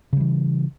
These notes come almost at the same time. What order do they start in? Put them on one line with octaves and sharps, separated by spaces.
C#3 G3 E3